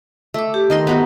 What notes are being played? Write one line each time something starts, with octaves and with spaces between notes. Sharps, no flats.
A3 D6 E6
G4
D#3 D#5 C6
B3 D#4 F#4